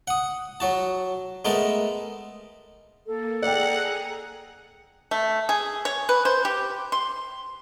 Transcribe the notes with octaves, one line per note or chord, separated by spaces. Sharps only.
F#5 D#6
F#3 F#4 A5
G#3 A3 B3 A#4 A5
A#3 A4
G#4 D5 F#5 G5 A#5
A3
G#4
C#5
B4
C5
G4
C6